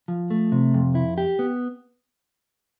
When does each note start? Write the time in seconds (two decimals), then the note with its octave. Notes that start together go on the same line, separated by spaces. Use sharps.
0.08 F3
0.30 A3
0.52 C3
0.74 F2
0.95 E4
1.18 G4
1.39 B3